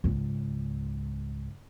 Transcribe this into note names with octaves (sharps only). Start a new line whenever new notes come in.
C#2 G#2